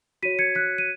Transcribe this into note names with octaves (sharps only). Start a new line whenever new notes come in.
F#4 C#5 B6 D#7
G#6 C#7
F#6 B6
D#7